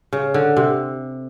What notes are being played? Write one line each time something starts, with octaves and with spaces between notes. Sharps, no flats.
C#3
D3
C3